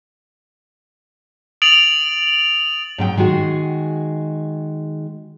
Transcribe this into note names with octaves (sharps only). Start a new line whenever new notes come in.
D#6 A6 D7 F7 F#7
G#2 F#3 G5
D#3 G#3 F#4 G#4